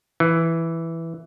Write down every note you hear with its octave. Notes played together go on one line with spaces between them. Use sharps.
E3